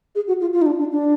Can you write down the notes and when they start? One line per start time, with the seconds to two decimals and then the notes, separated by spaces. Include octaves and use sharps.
0.15 G#4
0.28 F#4
0.41 F4
0.53 F4
0.62 D#4
0.66 D4
0.79 D4
0.92 D4